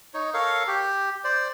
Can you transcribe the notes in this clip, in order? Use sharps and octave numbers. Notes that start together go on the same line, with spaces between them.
D#4 C#5
A4 A#4 C#5 F5
G4
C5 D5